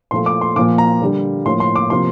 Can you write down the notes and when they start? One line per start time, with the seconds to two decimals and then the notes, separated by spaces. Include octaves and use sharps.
0.11 A#2 F3 A3 C6
0.26 D6
0.41 C6
0.56 A#2 F3 A#3 D6
0.78 A#5
1.01 D3 G3 A#3
1.46 A2 F3 A#3 C6
1.60 C6
1.76 D6
1.90 C3 F3 A#3 C6